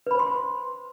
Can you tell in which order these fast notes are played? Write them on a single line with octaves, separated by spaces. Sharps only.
B4 B5 C5 C6